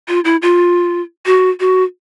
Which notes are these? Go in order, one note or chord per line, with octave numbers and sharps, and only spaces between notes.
F4
E4
F4
F#4
F#4